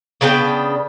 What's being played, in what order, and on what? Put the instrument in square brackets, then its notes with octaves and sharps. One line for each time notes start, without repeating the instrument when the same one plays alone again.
[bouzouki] C#3 B3 D4 G5